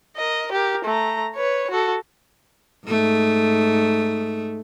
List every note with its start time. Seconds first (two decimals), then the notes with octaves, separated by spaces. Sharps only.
0.16 A#4 D#5
0.52 G4 A#4
0.85 A3 A#5
1.36 B4 C#5
1.71 F#4 A4
2.87 G#2 A3